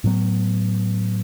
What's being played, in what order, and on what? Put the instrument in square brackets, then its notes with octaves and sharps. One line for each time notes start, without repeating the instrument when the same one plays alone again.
[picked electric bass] A2 F#3 B3